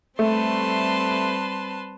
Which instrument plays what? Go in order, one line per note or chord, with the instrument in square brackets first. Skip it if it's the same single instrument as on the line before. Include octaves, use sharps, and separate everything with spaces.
[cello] G3 C4 [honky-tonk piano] A3 [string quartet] B4 A5 C6